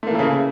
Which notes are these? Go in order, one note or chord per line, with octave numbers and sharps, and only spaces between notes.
C#3 E3 A3 A#3 E4